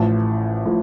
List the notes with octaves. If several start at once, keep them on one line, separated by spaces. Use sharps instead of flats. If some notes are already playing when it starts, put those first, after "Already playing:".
Already playing: A1 A2 F3 A5
A2 F3